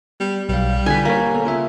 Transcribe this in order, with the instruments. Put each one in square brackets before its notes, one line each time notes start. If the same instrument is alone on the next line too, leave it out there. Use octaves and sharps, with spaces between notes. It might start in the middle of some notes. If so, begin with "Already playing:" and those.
[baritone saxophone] G3 [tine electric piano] B3
[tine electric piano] B1 F5 [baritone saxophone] G3
[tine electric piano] D3 G#6 [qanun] B4 G#5
[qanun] A#3 [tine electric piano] C#5 A#5
[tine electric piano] B3 A4
[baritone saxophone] C#3 [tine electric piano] F4 E5